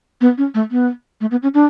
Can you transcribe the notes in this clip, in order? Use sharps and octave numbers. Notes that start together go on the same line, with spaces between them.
B3
C#4
A3
B3
A3
B3
C#4
D4